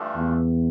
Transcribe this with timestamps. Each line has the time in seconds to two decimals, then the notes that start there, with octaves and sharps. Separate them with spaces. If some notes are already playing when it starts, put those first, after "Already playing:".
Already playing: G2 E3 A3 D4 F4
0.15 E2